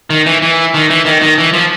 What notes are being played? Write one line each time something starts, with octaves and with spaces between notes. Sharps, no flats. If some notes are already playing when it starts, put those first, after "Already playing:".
D#3
E3
E3
D#3
E3
D#3
D#3
E3
F3